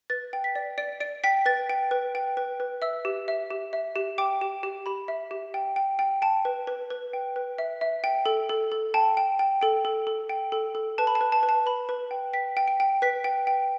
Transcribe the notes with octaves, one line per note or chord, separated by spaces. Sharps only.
B4 A6
G5
B6
D5
D5 D7
D5 D7
G5 B6
B4 A6
G5
B4
G5
B4
B4
E5 E6
G4
E5
G4
E5
G4
G5 D6
G4
G4
G4 B5
E5
G4
G5
G5
G5
G5 A5
B4
B4
B4
G5
B4
E5
E5
G5
A4
A4
A4
G5 A5
G5
G5
A4 G5
A4
A4
G5
A4
A4
B4 A5
B5
A5
B4
A5
B4
A5
B4 B5
B4
G5
G5 B6
G5
D7
G5
B4 B6
G5
G5